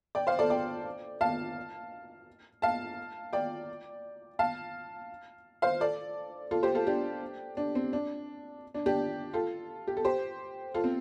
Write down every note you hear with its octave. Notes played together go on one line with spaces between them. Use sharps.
D5 G5
C5 F5
A4 D5
D5 G5
F5 A5
F5 A5
D5 G5
F5 A5
C5 F5
A4 D5
F4 A4
G4 C5
F4 A4
D4 G4
D4
C4
D4
D4
D4 G4
F4 A4
G4
A4
G4 C5
F4 A4
C4